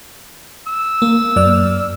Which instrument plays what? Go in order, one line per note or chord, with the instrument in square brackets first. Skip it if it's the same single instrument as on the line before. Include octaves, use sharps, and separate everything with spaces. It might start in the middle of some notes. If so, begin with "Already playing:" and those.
[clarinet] E6
[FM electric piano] A#3
F#2 D5 F6